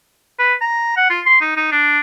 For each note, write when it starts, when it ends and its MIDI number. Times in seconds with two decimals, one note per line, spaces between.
0.39 0.54 71
0.61 0.94 82
0.97 1.08 78
1.10 1.20 65
1.26 1.36 84
1.41 1.54 63
1.57 1.69 63
1.71 1.99 62